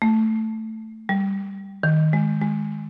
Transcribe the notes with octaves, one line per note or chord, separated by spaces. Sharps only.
A3
G3
D#3
G#3
G#3